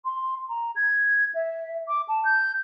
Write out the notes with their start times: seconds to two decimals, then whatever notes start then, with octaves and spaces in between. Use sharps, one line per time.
0.04 C6
0.48 A#5
0.75 G#6
1.34 E5
1.88 D6
2.08 A5
2.24 G6